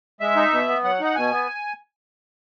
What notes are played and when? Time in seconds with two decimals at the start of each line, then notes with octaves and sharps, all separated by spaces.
0.21 G#3 E5
0.36 D#4
0.52 B2
0.68 B3
0.84 F#3 F#5
1.00 D#4 F#5
1.16 B2 G#5
1.32 B3